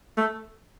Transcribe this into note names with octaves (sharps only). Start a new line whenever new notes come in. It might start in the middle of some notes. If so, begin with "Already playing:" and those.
A3